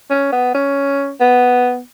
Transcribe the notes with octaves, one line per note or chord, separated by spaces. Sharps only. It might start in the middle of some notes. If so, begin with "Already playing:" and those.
C#4
B3
C#4
B3